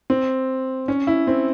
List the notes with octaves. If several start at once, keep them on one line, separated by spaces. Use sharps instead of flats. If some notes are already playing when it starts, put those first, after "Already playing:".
C4
C#4
E4
C4